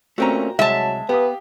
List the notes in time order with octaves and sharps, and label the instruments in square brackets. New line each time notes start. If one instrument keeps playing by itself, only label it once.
[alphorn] A#2 [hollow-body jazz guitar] A3 C4 C#4 [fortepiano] F#4 G5 A#5
[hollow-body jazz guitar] C2 [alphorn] F#3 [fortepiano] G#3 [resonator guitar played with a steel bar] E5 A5
[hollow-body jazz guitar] B3 [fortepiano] G4 F5 D#6 [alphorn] B4